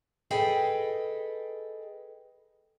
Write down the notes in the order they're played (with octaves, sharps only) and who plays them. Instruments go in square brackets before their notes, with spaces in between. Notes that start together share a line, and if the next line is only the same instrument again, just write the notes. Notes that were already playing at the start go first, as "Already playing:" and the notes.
[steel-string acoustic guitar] G#4 A4 B4 D#5 G5